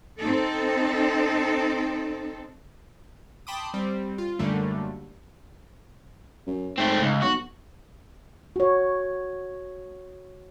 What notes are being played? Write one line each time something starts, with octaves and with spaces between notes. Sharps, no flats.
C4 D#4 A4
G5 A5 B5 C6 D6 D#6
G3 C4
F4
F#2 D3 G3 A3 A#3
F#2
G#2 A3 C4
C#2
B1 F#4
F#4 C#5